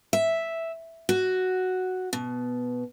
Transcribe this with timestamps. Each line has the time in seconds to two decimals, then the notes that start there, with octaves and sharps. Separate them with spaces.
0.13 E5
1.09 F#4
2.13 B2